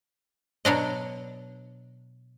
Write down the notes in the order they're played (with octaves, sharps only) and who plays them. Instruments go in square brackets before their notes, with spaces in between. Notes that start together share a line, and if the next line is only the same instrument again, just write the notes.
[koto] B2 F#3 D4 D#5